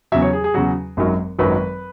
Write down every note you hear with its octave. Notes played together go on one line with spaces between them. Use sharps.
E2 C#3 F#3 E5
C#5
G#4
G#4
E2 C#3 F#3 F#4
G#1 F#2 D#3 F#3
G#1 F#2 D#3 F#3 B4